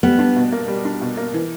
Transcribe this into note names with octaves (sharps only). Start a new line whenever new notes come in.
G3 B3
D4
B2
A#3
G3
D4
B2
A#3
E3